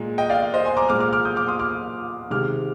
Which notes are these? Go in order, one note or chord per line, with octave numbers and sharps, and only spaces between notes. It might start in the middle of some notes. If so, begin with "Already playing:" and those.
Already playing: A#2 G#3
D#5 G5
D5 F5
C5 D#5
G#5 C6
A#5 D6
A#2 G#3 D6 F6
D6 F6
D6 F6
D#6 G6
D6 F6
C6 D#6
D6 F6
C3 D#3 G#3 D6 F6